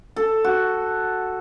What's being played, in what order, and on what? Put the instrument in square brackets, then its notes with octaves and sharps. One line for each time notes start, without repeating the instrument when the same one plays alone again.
[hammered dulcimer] A4
F#4